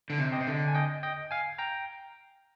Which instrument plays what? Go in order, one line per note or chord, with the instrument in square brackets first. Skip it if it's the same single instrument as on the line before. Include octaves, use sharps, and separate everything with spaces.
[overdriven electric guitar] D3
C3
[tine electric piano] D#5 G5
[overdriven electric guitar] C3
D3
[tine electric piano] G#5
D#5 G5
D#5 G5
F5 G#5
G5 A#5